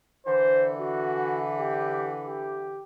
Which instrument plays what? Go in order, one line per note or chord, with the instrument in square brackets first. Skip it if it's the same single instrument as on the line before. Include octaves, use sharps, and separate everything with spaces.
[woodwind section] D3 E3 [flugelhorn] C5
[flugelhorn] F#4
G4
G4